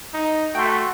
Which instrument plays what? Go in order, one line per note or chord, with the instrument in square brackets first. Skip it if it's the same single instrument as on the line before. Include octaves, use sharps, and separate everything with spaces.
[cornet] D#4
[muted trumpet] A3 [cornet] F#4 [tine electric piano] G5 C6